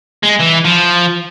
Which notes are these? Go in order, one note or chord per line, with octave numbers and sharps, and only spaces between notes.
G#3
E3
F3